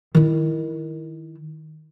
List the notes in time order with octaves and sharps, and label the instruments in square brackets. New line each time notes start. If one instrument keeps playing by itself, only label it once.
[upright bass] D#3 E4